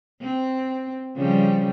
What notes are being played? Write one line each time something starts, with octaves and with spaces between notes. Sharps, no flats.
C4
C#3 F3 G3